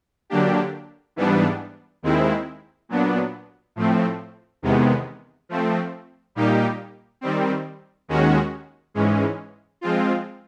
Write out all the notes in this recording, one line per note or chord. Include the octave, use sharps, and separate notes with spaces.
D3 F#3 A#3 D4 G4
G#2 E3 G3 B3 D4
D#2 D#3 G#3 C4 E4
A#2 F#3 B3 D4
A2 F3 A3 C4
E2 C3 D#3 G#3 B3
F3 A3 C4
A#2 G3 A#3 D#4 G4
D#3 G3 C4
D#2 D#3 G#3 C#4 F#4
G#2 E3 G#3 C#4
F3 G#3 C4 F4